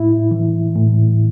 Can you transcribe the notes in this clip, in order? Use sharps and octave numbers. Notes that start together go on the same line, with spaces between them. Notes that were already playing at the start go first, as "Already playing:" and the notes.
Already playing: A2 E4
E3
A2